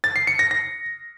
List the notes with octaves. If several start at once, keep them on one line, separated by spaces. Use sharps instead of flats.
A6
C7
C#7
A#6
A#6